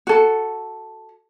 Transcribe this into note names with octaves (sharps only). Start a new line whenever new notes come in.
F#4 A4